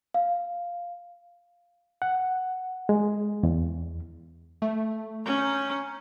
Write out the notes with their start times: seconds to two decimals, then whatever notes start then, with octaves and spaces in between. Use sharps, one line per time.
0.14 F5
2.02 F#5
2.89 G#3
3.43 E2
4.62 A3
5.26 C#4 A#5 C#6 G6